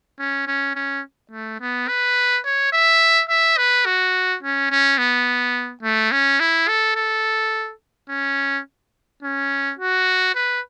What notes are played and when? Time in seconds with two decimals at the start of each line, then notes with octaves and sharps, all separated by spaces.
0.19 C#4
0.47 C#4
0.75 C#4
1.31 A3
1.60 B3
1.88 B4
2.45 C#5
2.73 E5
3.29 E5
3.58 B4
3.86 F#4
4.43 C#4
4.71 C#4
4.98 B3
5.83 A3
6.12 C#4
6.40 E4
6.68 A4
6.96 A4
8.09 C#4
9.23 C#4
9.79 F#4
10.35 B4